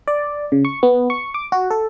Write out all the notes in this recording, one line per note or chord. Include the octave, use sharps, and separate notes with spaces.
D5
C#3
C#6
B3
C#6
D6
F#4
A4